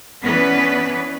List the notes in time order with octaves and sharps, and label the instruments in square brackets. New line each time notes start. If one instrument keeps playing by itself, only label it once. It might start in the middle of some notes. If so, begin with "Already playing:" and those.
[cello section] E3 B3 C#4 D4 B4